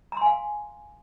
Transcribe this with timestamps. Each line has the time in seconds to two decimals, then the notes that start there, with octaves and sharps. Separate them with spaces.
0.12 A#5
0.17 C6
0.21 G#5
0.26 F5